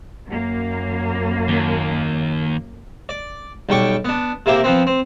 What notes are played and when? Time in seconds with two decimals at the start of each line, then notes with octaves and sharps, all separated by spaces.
0.27 F#2 A#3
1.49 D#2
3.09 D5
3.69 B1 G3 G5 C#6 D6
4.05 B3 D4
4.46 C3 A#3 E4 G4
4.64 F3 B3 C4
4.87 C4